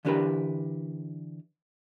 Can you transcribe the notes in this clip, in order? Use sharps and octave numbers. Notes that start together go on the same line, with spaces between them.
D3 E3 D4 G4 A#4 B4